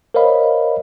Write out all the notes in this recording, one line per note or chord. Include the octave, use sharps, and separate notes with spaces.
A#4 C5 C#5 D#5 F5 B5